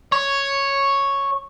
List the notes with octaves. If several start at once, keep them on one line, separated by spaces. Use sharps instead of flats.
C#5